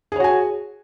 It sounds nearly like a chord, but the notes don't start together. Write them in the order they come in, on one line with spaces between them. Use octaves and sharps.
G#4 C#5 F#4 G#5